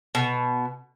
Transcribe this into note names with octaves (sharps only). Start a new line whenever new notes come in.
B2